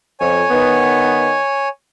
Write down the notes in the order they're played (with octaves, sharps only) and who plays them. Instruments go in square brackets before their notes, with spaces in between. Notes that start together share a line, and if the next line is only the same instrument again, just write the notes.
[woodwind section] F2 [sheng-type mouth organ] C#5 G#5
[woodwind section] D#3 B3